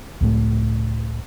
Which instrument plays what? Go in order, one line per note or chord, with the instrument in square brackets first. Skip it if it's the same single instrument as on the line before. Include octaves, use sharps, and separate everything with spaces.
[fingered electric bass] C#2 A2 A3